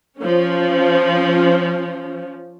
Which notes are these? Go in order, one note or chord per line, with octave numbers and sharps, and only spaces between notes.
F3 C#4